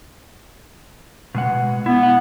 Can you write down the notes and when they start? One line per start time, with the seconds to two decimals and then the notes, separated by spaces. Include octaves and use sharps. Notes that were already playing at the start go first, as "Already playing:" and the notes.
1.35 B2 G#3 F#5
1.86 B3 E4
2.03 F#5